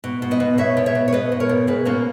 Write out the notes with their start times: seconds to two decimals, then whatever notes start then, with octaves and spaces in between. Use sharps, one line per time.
0.04 B2
0.22 B2
0.31 B4 D#5
0.40 B2
0.58 B2 C#5 E5
0.77 B2
0.86 C#5 E5
0.95 B2
1.08 C#5
1.13 B2 B4 D#5
1.32 B2
1.40 A#4 C#5
1.49 B2
1.67 B2 G#4 B4
1.85 B2 A#3 C#4